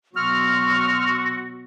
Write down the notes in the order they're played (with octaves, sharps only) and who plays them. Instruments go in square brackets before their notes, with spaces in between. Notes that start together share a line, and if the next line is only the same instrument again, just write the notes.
[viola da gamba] B2 F#3 [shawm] F#4 [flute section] C6 C#6 E6 [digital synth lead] F6